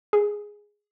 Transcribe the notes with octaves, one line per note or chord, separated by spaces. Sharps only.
G#4